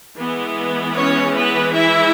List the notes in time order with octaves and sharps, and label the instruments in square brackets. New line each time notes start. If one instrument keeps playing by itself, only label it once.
[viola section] E3 G#3 B3
C#4 C#5
B3 B4
E4 E5